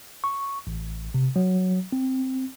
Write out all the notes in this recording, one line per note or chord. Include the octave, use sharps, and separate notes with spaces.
C#6
A1
C3
F#3
C4